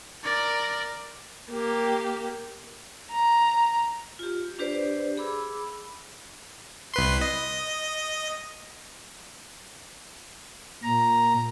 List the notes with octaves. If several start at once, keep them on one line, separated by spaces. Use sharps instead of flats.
A#4 D5
A#3 G4
A#5
F4 G4
D4 G4 B4 C5 D5
G#4 B5 D6 E6
C2 B4 C6
D#5
A#2 A#5